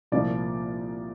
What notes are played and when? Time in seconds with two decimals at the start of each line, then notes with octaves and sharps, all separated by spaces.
0.12 C2 A#2 F3 A#3 D5